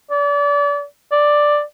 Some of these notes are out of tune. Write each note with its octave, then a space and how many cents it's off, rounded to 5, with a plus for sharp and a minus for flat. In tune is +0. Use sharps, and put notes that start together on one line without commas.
D5 -35
D5 +5